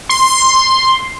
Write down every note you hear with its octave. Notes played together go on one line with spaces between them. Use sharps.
C6